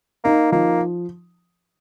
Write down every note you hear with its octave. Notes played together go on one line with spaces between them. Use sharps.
A#3 D#4
F3 A#3